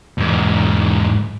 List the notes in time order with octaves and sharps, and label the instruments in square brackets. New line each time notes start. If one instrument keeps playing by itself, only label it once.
[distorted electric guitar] E2 G#2